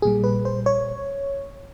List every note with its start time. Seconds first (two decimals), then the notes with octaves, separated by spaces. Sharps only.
0.02 A#1 A#2 G3 G#4
0.24 B4
0.45 C5
0.66 C#5